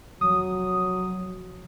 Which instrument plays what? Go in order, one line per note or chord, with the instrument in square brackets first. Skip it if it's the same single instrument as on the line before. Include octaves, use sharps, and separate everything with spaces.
[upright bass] F1 F3 [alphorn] F#3 [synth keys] D#6